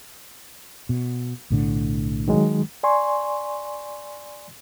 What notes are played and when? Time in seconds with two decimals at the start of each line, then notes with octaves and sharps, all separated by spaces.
0.89 B2
1.50 B1 A2 D3
2.28 D#3 F#3 G#3
2.83 D5 G#5 C6 C#6